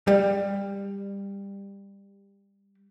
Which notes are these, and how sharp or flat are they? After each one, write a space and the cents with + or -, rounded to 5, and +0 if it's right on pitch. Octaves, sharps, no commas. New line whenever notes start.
G3 +20